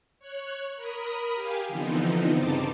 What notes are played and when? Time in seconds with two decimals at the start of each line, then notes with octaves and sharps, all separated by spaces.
0.20 C#5 F#6
0.76 A#4 B5 D#6
1.35 G4 F5 G#5
1.68 D3 E3 F3 B3 C4 D#4
2.35 G2 C#3 C4 D#4 A5 D6